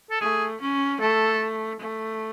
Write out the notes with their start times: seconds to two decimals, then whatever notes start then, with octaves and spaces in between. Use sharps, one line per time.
0.10 A4
0.21 A3 G#4
0.61 C#4
1.00 A3 A4
1.80 A3